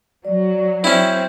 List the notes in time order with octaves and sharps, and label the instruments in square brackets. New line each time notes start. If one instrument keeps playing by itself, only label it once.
[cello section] F#3 [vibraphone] D5
[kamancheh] C4 [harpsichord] C#4 E4